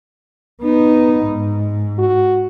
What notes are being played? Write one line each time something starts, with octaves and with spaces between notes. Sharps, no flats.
B3 D#4
G#2
F#4